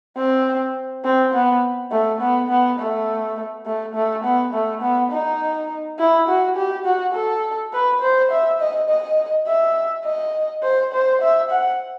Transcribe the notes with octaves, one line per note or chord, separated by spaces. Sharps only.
C4
C4
B3
A3
B3
B3
A3
A3
A3
B3
A3
B3
D#4
E4
F#4
G4
F#4
A4
B4
C5
E5
D#5
D#5
E5
D#5
C5
C5
E5
F#5